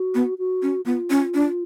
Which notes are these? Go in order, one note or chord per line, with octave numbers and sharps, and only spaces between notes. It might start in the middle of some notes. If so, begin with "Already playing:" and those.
Already playing: F#4
B3
F#4
C#4
B3 F4
C#4
D4